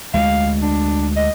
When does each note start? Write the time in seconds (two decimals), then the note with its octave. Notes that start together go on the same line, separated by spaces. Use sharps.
0.14 D2 G#3 F5
0.62 D4
1.16 D#5